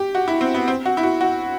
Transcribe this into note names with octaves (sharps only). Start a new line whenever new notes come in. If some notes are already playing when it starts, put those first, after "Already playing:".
Already playing: G4
F#4
E4
C4
B3
C4
F#4
E4
F#4
F#4